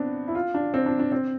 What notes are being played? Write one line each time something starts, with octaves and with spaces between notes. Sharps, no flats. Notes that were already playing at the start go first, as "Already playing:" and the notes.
Already playing: B3 C4 D4
E4
F4
D4
C4
D4
D4
C4